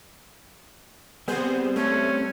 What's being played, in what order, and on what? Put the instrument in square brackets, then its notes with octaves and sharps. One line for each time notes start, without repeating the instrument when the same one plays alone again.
[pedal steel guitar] G3 C4 [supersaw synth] B3 G#4 C5
[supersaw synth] A3 [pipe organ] C#4